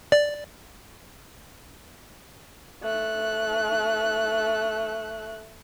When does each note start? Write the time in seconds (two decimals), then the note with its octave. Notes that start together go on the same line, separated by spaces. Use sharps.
0.12 D5
2.82 A3 F#6